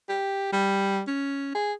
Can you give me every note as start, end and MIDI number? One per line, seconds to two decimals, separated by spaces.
0.09 0.49 67
0.52 1.01 55
1.07 1.53 61
1.55 1.73 68